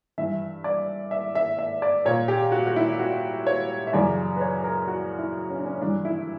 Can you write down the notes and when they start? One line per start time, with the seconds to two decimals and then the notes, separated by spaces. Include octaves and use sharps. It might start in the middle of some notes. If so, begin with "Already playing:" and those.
0.18 G2 E3 E5
0.64 D5
1.11 E5
1.35 E5
1.59 E5
1.82 D5
2.05 A#2 C#5
2.28 G4
2.52 F#4
2.67 F#4
2.76 E4
2.99 F#4
3.47 C#5
3.87 E5
3.93 F#2 C#3 E3 D5
4.36 B4
4.41 C#5
4.64 A#4
4.88 F#4
5.18 E4
5.50 C#4
5.58 D4
5.66 C#4
5.81 G2 E3 D4
6.05 E4